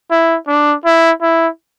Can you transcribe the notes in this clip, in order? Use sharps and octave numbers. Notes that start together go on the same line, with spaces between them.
E4
D4
E4
E4